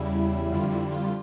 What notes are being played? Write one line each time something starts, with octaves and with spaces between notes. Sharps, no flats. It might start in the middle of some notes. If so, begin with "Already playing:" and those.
Already playing: E2 C#3 G3 E4
F2 D3 G3 F4
E4
F4